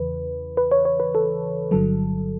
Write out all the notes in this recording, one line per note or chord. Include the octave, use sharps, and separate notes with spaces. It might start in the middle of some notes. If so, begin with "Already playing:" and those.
Already playing: E2 C#3 E3 B4
B4
C#5
C#5
B4
A4
G1 G2 D3 F#3 A4